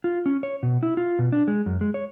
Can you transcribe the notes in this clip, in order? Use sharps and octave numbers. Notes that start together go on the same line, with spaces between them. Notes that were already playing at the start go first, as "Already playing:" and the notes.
F4
C#4
C#5
B2
E4
F4
B2
D4
G#3
F#2
G#3
C#5